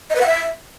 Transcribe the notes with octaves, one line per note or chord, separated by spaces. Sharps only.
D#5
B4
F#5
E5